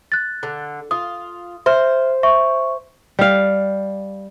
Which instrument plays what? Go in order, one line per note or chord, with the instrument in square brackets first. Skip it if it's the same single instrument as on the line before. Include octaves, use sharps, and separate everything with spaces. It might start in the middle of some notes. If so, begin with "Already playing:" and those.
[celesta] F#6 A6
[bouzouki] D3
[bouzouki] F4 [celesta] D#6
[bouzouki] C5 [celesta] E5 F6
[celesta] E5 C#6
[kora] G3 F5